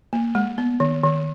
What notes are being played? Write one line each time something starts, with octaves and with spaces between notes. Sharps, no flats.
A#3
G#3
B3
D#3
D#3